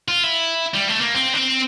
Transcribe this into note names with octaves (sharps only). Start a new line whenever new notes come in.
F4
E4
G3
A3
A#3
C4
D4
C4